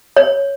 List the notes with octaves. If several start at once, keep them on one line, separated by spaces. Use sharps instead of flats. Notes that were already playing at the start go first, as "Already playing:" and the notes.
C#5